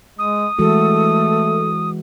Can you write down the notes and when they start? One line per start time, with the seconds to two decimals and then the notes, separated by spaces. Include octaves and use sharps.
0.19 G#3 D#6
0.59 E3 G#3 A3 F#4 A4